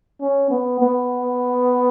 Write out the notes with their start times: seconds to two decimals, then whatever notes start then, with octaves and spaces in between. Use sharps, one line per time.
0.21 C#4
0.50 B3
0.80 B3